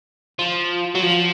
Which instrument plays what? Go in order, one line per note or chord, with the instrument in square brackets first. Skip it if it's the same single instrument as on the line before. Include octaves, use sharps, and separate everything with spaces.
[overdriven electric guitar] F3
F#3
F3